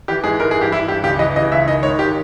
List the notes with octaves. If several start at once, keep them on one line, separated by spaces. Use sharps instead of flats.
E3 G4
G#2 G#4
E3 A#4
G#4
G2
G4
E3 E4
G2 G4
C#2 G4
E3 D#5
C#3 D#5
C#2 E5
D#3 D#5
G#2 C#5
D#3 G4